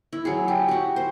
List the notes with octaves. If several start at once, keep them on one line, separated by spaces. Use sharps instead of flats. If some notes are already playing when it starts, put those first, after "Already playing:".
E4
F#3 G#4
G4
F#4 G4
C5